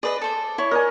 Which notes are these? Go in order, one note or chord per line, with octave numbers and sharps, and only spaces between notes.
G#4 B4 D5 D#5
A4 C5
E4 C#5
A#4 D5 D#5 G#5